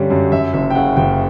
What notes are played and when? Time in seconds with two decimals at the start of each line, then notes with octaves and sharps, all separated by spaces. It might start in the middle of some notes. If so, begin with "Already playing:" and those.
Already playing: G2 D3 G3 C#4
0.10 F#2
0.32 F#2 E5
0.53 F#1 E5
0.70 G5
0.75 C#3 F#5
0.97 F#1 G5